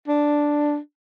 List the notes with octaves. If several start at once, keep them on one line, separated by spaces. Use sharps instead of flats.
D4